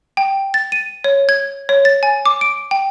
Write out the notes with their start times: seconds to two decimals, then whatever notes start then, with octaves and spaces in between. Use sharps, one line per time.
0.17 G5
0.54 A6
0.72 D#7
1.04 C#5
1.29 G#6
1.69 C#5
1.85 A6
2.03 G#5
2.26 D6
2.41 D7
2.71 G5